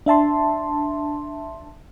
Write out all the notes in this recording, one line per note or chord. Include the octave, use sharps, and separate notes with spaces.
D4 E5 A5 C6